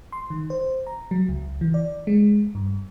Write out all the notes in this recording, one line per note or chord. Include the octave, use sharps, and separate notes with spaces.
C6
D#3
C5
A#5
F#3
C#2
E3
D5
G#3
G2